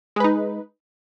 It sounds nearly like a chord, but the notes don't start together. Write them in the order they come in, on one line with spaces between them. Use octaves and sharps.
G#3 B4 D#4